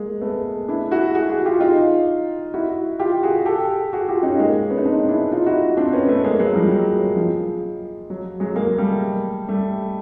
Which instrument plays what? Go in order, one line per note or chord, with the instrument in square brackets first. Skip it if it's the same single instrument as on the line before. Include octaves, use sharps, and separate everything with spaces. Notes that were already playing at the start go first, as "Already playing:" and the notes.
Already playing: [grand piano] G#3 A#3
A3 B3
D4 E4
E4 F#4
F#4 G#4
F#4 G#4
F4 G4
D#4 F4
E4 F#4
F4 G4
F#4 G#4
G4 A4
F#4 G#4
F4 G4
C#4 D#4
G#3 A#3
B3 C#4
D#4
C4 D4
D4 E4
D#4 F4
E4 F#4
C4 D4
B3 C#4
A3 B3
G#3 A#3
F#3 G#3
F3 G3
F#3
F#3
F3
F#3
F#3 G#3
G#3 A#3
G3 A3
G3 A3